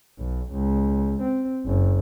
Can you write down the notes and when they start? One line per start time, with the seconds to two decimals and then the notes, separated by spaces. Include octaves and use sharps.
0.19 B1
0.52 C#2
1.22 C4
1.66 F#1